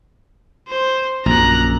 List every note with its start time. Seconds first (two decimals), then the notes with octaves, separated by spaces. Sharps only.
0.68 C5
1.26 A#1 F#2 A#5 F#6